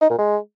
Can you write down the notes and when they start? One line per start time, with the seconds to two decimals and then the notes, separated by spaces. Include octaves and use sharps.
0.01 D#4
0.10 A#2
0.18 G#3